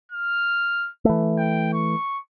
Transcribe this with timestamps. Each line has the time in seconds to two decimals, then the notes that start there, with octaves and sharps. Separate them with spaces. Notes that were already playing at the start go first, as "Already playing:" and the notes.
0.12 F6
1.05 E3 A3
1.38 G5
1.73 C#6